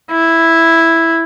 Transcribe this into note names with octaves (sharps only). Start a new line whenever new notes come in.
E4